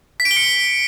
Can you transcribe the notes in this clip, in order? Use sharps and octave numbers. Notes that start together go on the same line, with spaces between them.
B6
D7
G7
C#7